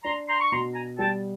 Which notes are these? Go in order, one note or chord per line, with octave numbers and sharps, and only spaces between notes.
D4 A#5 C6
A#5 C6
C#6
B2 A#5 C6
G#5 A#5
G3 G5 A5